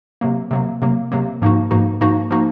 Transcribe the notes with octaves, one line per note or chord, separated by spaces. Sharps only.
C3 F#3 A#3
C3 F#3 A#3
C3 F#3 A#3
C3 F#3 A#3
G#2 F3 A#3 D#4 F#4
G#2 F3 A#3 D#4 F#4
G#2 F3 A#3 D#4 F#4
F3 A#3 D#4 F#4